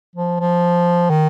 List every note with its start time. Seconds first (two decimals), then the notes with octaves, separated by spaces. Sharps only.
0.16 F3
0.40 F3
1.10 D#3